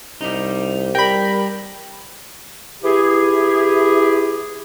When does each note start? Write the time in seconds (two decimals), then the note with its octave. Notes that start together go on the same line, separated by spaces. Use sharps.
0.21 C2 G3 D#4
0.95 G3 A#4 G5 B5
2.83 E3 E4 G4 G#4